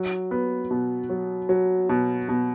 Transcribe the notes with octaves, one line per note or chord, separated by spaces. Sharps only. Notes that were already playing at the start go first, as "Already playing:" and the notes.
Already playing: F#3
B3
B2
F#3
F#3
B2
B2